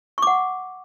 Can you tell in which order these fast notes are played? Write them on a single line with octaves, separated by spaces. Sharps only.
C#6 D6 F#5